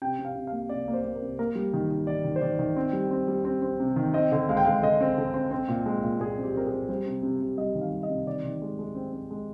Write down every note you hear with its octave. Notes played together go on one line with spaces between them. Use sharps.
C3 G5
C3
F5
C3
A#3 F5
C3 D5
A#3
C5
A#3
A#4
C3
A#3 A#4
G3
D#3
D#3
D#3 D5
D#3
C5
D#3 D5
D#3
C4
G3
C4
G3
C4
C4
C3
D#3
C4 D#5
D3
G#3 F5
G5
G#3 F5
D3 D#5
C4
D3
C4
C4
A#2
G#3
A#2
A#2 G#4
C4
G4
C4 A#4
G#4
C4
G3 C5
C3
C3
C3
G3 D#5
D#3
F5
G3
D#5
C3
D#3 D5
D#3
G#3
G#3
C4
C4
G#3